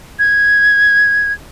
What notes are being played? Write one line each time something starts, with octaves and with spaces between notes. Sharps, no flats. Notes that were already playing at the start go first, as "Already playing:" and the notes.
G#6